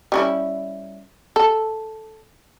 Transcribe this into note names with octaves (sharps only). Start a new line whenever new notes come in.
G3 C#4 E4
A4